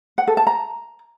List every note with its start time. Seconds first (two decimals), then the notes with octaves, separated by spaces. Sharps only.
0.18 F#5
0.27 A4
0.37 A5
0.47 A#5